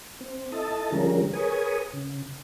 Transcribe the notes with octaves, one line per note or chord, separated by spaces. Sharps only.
C4
E4 A4 D#5 A5
D3 F3 G3 G#3 C#4 A#4
G#4 A#4 B4 C#5 G#5 D#6
C#3